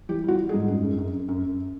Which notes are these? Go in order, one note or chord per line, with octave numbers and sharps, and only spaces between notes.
E3 G4
G3 F#4
G3
G#4
G#2
F#2 G#4
F#2
F#2
F#2
F#2
F#2